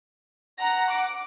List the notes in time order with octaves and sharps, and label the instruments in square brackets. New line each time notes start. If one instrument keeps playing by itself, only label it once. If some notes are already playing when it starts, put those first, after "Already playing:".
[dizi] F#5 [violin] A#5 A#6
[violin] D6